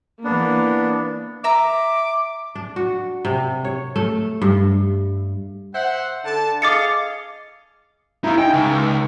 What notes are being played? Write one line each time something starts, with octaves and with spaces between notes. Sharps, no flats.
E3 A#3 B3 D4
E5 A#5 D6
D4
F#4
C3
C#5
A3
G2
C5 E5 F#5
D3 A5
G#4 D#5 F5 D6 A6 C#7
D#4 E4 F5 A#5
D#4 G5 G#5
C#2